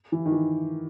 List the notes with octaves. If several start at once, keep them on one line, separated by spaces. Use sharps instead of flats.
E3
D#3
E3